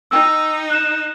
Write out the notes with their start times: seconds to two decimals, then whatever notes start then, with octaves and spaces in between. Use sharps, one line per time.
0.11 D#4 G5 E6
0.70 F#6 E7